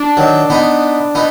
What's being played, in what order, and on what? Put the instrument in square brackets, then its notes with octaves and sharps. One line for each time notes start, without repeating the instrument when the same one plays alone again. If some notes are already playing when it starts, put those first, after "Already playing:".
Already playing: [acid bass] D4
[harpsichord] D#3 F#3
B3 D#4
B3 D#4